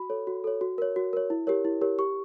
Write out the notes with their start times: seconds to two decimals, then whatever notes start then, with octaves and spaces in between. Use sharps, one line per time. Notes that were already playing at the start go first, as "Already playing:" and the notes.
Already playing: F#4 B5
0.10 A4 C#5
0.27 F#4
0.44 A4 C#5
0.61 F#4
0.78 A#4 C#5
0.96 F#4
1.13 A#4 C#5
1.30 E4
1.47 G4 A#4 C#5
1.65 E4
1.81 G4 A#4 C#5
1.98 G4 C#6